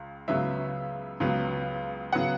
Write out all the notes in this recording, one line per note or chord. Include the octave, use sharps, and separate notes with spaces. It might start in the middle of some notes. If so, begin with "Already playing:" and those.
Already playing: C#2 C#3
C#2 C#3 F#3 B3 E5
C#2 C#3 F#3 B3
C#3 F#3 B3 F#5